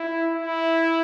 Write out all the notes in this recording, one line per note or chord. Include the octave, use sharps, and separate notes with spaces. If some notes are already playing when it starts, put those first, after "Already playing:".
Already playing: E4
E4